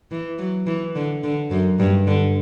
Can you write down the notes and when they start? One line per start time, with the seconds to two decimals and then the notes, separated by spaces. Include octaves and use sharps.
0.11 E3
0.39 F#3
0.67 E3
0.96 D3
1.23 D3
1.51 F#2
1.79 G2
2.07 D3